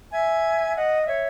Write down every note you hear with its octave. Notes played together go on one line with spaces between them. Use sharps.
E5 G#5
D#5 F#5
F#5
C#5 E5